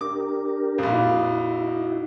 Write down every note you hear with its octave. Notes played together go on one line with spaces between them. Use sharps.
D4 G4 A#4 D6
A#1 F2
D#4 E4 F#4